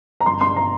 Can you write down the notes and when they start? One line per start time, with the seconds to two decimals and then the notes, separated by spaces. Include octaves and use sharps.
0.21 A#5
0.26 G1 C6
0.41 G2 C6
0.56 A#5